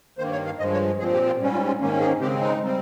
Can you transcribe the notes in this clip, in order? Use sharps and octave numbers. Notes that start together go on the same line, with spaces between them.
G2 D#3 A#3 C5
C#5
F5
G2 F3 G#3 D#5
C#5
A#2 F3 C4 G#4
G4
F4
G#2 G3 C#4
F4
F4
G#2 D#3 A#3 C#4
G#4
C#3 G#3 C4 G4
D#4
G3 C4